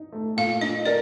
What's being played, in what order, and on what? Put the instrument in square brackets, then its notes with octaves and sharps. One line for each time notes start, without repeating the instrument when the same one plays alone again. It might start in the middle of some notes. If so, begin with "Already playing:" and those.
Already playing: [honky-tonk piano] D#4
A3
[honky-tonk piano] A#2 [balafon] F5
[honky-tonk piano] D#4 [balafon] D#5
[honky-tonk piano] A#4 [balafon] D5